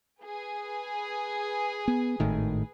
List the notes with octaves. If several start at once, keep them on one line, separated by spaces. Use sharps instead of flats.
G#4 B4
B3
G#1 A2 D#3